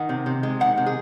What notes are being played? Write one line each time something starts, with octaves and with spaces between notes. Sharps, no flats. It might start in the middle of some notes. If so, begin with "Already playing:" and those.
Already playing: D#3 F#5
C3
C3
G#3
D#3 F#5
C3
G#4